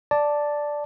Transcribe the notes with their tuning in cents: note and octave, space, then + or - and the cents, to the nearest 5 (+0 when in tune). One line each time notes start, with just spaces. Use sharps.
D5 +0 A5 +0